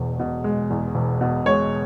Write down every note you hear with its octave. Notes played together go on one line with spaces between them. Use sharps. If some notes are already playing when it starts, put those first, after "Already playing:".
Already playing: E1 E2 B2 G#3
B2
G#3
E2
E1
B2
G#3 C#5